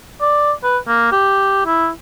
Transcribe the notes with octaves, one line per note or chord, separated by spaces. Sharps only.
D5
B4
A#3
G4
E4